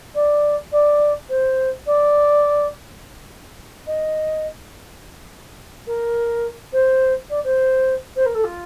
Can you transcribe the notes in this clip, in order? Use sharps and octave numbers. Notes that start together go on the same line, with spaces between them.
D5
D5
C5
D5
D#5
A#4
C5
D5
C5
C5
A#4
A4
F4